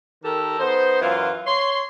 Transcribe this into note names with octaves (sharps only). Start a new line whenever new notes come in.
D#3 G4 A4 A#4
B3 D#4 C5
F#2 E3 F4
C#5 C6